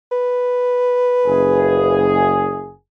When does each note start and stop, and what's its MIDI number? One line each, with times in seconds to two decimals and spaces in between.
0.12 2.12 71
1.26 2.71 30
1.26 2.71 68